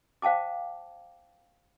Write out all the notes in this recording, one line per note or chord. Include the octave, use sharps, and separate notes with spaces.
C5 F5 G5 A5 D6